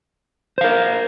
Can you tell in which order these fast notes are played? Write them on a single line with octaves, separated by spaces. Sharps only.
C5 F5 A#4